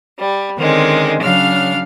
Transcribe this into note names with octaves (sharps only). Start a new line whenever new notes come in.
G3
D3 D#3 G#3 C4 C#4
C#3 F#3 D4 F5 F6